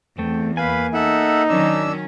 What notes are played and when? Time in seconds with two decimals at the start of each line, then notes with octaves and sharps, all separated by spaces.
0.18 E2 A3 C4 G5
0.57 A#3 B4 F5 G#5 B5
0.94 D#4 A4 E5 F#5
1.49 D#3 F#3 C#4 D4 E6